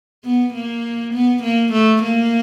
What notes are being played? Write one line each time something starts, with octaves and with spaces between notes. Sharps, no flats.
B3
A#3
B3
A#3
A3
A#3